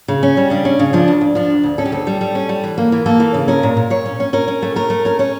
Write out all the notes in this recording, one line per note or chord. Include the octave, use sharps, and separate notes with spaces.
C#3
C#4
G3
C#3 D4
C#4
C#3
F3 D4
D2
D2
F3 D4
D2
D2
C#4 A4
G4
D2 A4
G3
G3
C#4
G3
E3
A#3
E3
A#3 A4
E3
C#3
C#4 A#4
A#2
A#2
A#2 C#5
C#4
C#4
C#4 A#4
C#4
A3
A3 A#4
A3
C#4 A#4
C#4 C#5